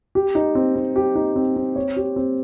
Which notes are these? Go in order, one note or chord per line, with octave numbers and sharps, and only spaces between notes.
G4
D#4
C4
C4
G4
D#4
C4
C4
C#5
G4
C4